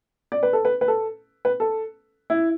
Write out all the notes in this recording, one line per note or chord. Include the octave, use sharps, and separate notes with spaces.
D5
B4
A4
B4
B4
A4
B4
A4
E4